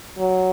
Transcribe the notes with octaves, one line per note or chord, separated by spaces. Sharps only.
F#3